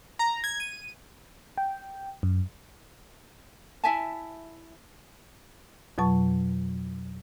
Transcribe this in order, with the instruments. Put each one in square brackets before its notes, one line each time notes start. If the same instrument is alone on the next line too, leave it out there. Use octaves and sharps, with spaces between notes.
[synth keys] A#5
G#6
D#7
[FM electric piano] G5
F#2
[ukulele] E4 E5 G#5 A5
[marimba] F2 B2 F#3 A5 C#6